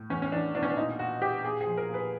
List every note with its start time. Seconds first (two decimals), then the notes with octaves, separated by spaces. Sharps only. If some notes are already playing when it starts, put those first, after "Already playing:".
Already playing: A2
0.10 E2 C#4
0.22 C#4
0.32 E2 D4
0.55 B2 D4
0.63 C#4
0.70 D4
0.77 A#2 D#4
0.99 A#2 F#4
1.22 A#2 G4
1.44 A#2 G#4
1.61 G#4
1.66 F3
1.77 A#4
1.89 A#2
1.94 B4